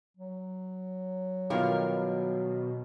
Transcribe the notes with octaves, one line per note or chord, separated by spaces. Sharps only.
F#3
B2 D#3 G3 F4 A#4 F5